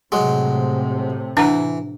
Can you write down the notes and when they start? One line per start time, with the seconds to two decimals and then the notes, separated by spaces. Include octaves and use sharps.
0.12 A2 C3 F#3 G#3
1.37 E3 D4 F#5 A#5